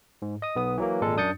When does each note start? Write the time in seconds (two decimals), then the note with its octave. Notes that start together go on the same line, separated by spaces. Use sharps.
0.22 G#2
0.42 D#5 D#6
0.56 B1 B3 D#6
0.78 E3 F#3 A#3
1.01 G#1 A#2 G#3 A4
1.17 F#2 D4 D#6 G6 A6 C#7